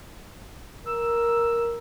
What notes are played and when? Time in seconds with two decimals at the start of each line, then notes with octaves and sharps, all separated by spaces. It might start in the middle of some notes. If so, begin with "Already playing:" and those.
0.86 A#4 E6